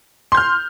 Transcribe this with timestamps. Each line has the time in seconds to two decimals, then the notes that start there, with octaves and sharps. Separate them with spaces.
0.32 C6
0.35 G6
0.37 F6